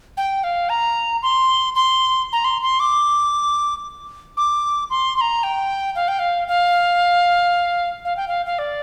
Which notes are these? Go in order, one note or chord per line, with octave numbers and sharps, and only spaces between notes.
G5
F5
A#5
C6
C6
A#5
C6
C6
D6
D6
C6
C6
A#5
G5
F5
G5
F5
F5
F5
G5
F5
F5
D5